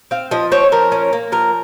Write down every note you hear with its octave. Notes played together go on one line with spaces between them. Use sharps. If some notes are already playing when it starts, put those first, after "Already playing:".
C4 F5
F3 D#5
C4 C#5
F3 A#4
C#4
A#3
F3 A#4